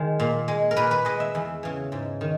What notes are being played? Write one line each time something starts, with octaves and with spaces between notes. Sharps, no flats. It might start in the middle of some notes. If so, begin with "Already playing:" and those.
Already playing: D#3 G#3
A#2
G#3
A#4
A#2 B4
B4
G#3 D#5
E5
E2
C#3 E3
G#2
D#3